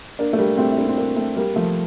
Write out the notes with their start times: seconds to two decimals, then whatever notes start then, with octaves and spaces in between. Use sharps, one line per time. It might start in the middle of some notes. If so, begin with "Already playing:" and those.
0.19 A#3 D4
0.33 A3
0.38 G3 A#3
0.58 A3 C4
0.72 E4
0.78 A#3 D4
0.88 C4
0.97 A#3 D4
1.16 A3 C4
1.36 G3 A#3
1.56 F3 A3